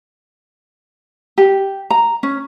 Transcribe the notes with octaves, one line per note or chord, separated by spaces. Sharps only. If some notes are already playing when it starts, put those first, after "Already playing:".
G4
A#5
C#4